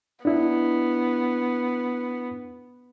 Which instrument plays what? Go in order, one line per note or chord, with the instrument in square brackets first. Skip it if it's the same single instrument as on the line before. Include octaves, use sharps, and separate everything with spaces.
[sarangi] B3 [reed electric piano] D4 E4